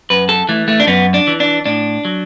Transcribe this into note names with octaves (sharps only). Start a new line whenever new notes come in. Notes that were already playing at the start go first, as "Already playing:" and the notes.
F#2 B4
A4
E3 A3
A3
D4
F#2 B3
D4
E3
D4
A2 D4
F#3